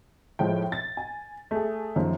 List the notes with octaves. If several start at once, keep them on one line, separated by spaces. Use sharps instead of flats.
A2 F3 G#3 G5
A6
G#5
A3 G#4
F#2 D#3 F3